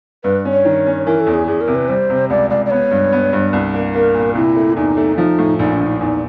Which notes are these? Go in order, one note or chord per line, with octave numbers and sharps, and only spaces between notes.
G2 B4
C#4
C#5
D#3
C#4
E3 A#4
A4
E2
G#4
E2 G#4
A#4
C3
B4
G3 C5
C3
C#2 D5
C#2 D5
D5
B3 C#5
G2
B3
G2
C2
A#3
A#3 A#4
A#2
C3 E4
A3
E2 D#4
A3
F3 D#4
A2
A#1 D#4
D4
A#1
D#4
E2 D#4